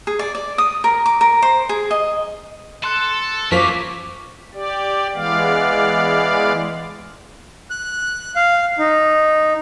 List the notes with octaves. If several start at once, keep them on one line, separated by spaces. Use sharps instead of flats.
G#4
D5
D5
D#6
A#4
D6
A#4
C5
G#4
D#5
A4 C6 F#6 C#7
F#2 D#3 F3 A#3 C#6 D6 B6
G4 D5
E3 G#3 B3 D5 F5
F#6
F5
D#4